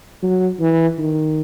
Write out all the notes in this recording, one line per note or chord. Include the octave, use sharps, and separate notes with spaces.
F#3
E3
D#3